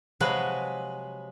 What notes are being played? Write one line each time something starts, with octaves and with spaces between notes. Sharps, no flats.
C3 F3 F#3 G#3 G#4 B4